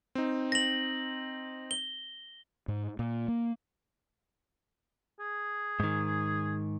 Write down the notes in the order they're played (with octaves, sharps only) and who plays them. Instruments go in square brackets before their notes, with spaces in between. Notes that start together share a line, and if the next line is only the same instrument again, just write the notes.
[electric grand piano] C4 D#4
[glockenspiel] A#6 F#7
G7
[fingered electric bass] G#2
A#2
A#3
[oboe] G#4
[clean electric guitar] G#2 D#3